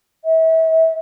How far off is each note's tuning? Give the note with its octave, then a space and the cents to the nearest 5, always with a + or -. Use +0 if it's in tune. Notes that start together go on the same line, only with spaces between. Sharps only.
E5 -30